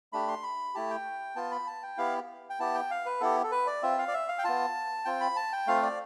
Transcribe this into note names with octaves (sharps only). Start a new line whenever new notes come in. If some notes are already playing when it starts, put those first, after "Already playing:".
A3 D4 G4 B5
C6
B5
A3 E4 G4 A5
G5
B3 F4 A5
B5
A5
G5
B3 E4 G4 F5
G5
B3 E4 G4 A5
G5
F5
B4
B3 E4 G4 A4
A4
B4
D5
C4 F4 E5
F5
D5
E5
F5
G5
B3 F4 A5
C4 F4 G5
B5
A5
G5
A3 C4 F4 F5
D5